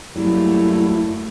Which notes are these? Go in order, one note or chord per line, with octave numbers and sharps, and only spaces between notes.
F#2 F#3 G3 A3 A#3 E4